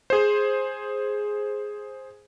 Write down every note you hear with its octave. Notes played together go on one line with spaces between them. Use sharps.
G#4 C5